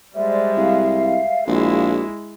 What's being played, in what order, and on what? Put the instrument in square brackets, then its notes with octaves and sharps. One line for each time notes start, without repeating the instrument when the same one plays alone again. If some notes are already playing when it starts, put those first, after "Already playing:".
[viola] G3 G#3 [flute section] C5 D5 [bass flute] E5
[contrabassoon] C2 [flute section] F5
[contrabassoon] A#1 [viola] G#3 E4 [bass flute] F#4